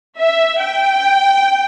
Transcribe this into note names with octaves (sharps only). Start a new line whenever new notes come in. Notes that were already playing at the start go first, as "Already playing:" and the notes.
E5
G5